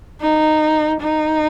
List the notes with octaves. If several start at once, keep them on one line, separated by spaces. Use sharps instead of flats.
D#4
D#4